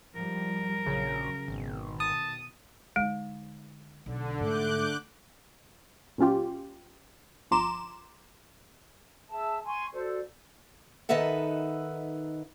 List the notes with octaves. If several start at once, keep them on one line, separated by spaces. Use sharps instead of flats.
G#2 F3 G3 A#4
A#1 C#3 F#3
G#1 B2 D#3
A5 D#6
D3 G#3 D#4
B1 D3
G#2 A3 D6 F#6 G6
A#2 F#3 C#4 F4 G4
G1 F3 A#5 C6 D6 E7
G#4 E5 A5 E6
G#5 C6 C#6
F#4 A4 C5 D5
D#3 D#4 A4 B4 E5 F#5